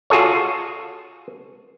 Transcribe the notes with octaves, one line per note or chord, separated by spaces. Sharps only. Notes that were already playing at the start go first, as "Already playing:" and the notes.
F4 F#4 G#4 A4 C#5